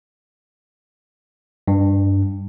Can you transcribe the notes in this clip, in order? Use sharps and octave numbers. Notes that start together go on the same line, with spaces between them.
G2